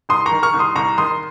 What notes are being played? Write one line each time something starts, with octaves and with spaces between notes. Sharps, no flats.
C2 C6 D#6
A#5 C#6
D#3
C#6 F6
C2
C6 D#6
C2 A#5 C#6
D#3 C6 D#6